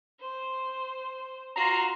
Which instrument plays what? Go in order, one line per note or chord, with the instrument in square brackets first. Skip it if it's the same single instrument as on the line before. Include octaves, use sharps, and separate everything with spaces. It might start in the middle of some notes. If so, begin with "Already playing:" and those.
[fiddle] C5
[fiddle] F4 F#4 [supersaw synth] A#5 C7